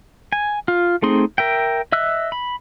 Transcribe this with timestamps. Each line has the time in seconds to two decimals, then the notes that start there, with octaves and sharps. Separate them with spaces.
0.32 G#5
0.68 F4
1.02 A3 C4 D#4 G#4 C6
1.38 A#4 E5 G5
1.92 D#5 E5 E6 F#6
2.32 B5